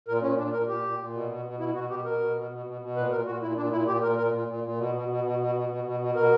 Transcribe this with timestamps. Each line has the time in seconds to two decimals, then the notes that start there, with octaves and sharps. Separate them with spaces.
0.08 A#2 A#4
0.23 A#2 C#4
0.38 A#2 D4
0.53 A#2 A#4
0.68 A#2 G4
0.84 A#2
0.99 A#2
1.14 B2
1.29 B2
1.45 B2
1.59 B2 E4
1.75 B2 F#4
1.90 B2 G4
2.05 B2 A#4
2.20 B2
2.36 B2
2.51 B2
2.66 B2
2.81 B2
2.96 A#2 B4
3.11 A#2 A#4
3.26 A#2 F#4
3.42 A#2 E4
3.57 A#2 D4
3.72 A#2 E4
3.88 A#2 G4
4.03 A#2 A#4
4.18 A#2 A#4
4.33 A#2
4.48 A#2
4.64 A#2
4.79 B2
4.94 B2
5.08 B2
5.24 B2
5.39 B2
5.55 B2
5.69 B2
5.84 B2
6.00 B2
6.15 B2 A#4